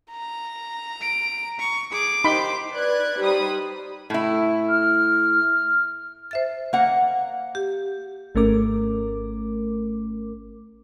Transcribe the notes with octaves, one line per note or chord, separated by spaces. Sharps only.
A#5
D7
C#6
G#4 D6
D#4 G4 C5 B5 C6
B4 D5 F#6 G#6
G3 D#4 C5 B5 D#6
A2 E4
F6
C5 E5 A6
A#3 F#5
G4
G#1 A3 C#4 A#4 D6